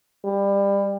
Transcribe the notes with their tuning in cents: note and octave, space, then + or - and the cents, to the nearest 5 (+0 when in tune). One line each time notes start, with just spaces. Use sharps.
G3 +25